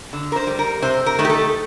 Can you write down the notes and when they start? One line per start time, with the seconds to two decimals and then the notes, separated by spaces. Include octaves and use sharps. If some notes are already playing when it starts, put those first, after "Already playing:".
0.13 D3
0.32 A#4
0.36 C5
0.47 G3
0.59 A#4
0.82 C3 C5
1.06 A#4
1.19 D#3 A3
1.25 G4
1.30 A4